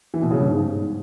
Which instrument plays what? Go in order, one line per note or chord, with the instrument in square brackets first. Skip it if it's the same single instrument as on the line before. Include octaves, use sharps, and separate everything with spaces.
[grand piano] E3
B2
C#3
G2
G#2